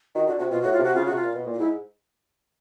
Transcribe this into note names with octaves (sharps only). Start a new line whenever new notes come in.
D#3 F#4
D3 F#4
C3 F#4
B2 F4
A2 F#4
F4
C3
F#4
C#3 F4
C3 F#4
F4
A#2
B2
A#2
F4
G#2 E4